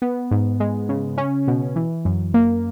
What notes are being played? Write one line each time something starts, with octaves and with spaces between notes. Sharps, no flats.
B3
G#2
G#3
C#3
C#4
B2
E3
F#2
A#3